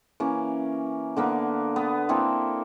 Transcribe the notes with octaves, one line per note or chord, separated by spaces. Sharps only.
E3 A#3 C#4
D3 A#3 B3
B3
A#3 C4 E4 A4